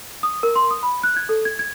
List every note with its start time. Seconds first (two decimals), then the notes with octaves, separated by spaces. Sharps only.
0.23 D#6
0.43 A#4
0.56 C6
0.71 D#6
0.83 B5
1.03 F#6
1.16 G#6
1.29 A4
1.45 G#6
1.59 G#6